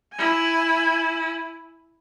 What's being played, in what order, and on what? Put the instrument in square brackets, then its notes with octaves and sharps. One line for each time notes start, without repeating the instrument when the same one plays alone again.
[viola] E4 G#5